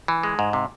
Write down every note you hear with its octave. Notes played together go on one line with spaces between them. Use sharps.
E3
G#3
G#2
C3